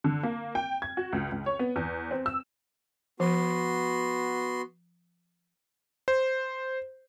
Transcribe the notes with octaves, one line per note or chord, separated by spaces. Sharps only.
D3
A#3
G5
G#6
F#4
C#2
C#2
C#5
B3
E2
C4
E6
F3 B3 F#4 C6
C5